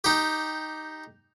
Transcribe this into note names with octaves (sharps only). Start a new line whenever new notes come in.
D#4 G4